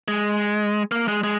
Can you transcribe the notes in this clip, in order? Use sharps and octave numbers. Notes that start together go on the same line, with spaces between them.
G#3
A#3
G#3
G#3